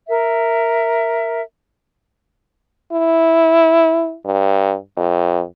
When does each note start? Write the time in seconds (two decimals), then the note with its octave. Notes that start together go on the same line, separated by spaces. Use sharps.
0.09 A#4 E5
2.92 E4
4.25 G2
4.97 F2